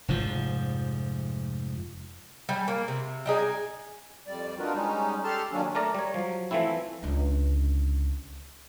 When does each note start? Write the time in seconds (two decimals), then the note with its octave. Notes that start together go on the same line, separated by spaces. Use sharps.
0.08 F1 G#2 F3
2.49 G3 G#5
2.68 A#3
2.88 C3
3.26 G3 D#4 G#4
3.38 G#5
4.27 F2 G3 D5
4.59 D4 D#4 F4 F#4 A#4 B4
4.73 G3 G#3 C#4 D#4
5.24 G4 A4 A5 C6 F6
5.52 D#3 F#3 A#3 C#4 D4
5.75 A3 A#4 D5 A#5
5.95 G3 C#5
6.14 F3 F#3
6.51 E3 F3 A3 C4 E4
7.03 C#2 D3